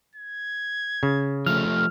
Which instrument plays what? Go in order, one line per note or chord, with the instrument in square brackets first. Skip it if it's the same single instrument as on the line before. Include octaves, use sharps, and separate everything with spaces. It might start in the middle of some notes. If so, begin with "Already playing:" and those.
[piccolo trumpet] G#6
[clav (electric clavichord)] C#3
[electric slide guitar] F3 A3 [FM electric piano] F6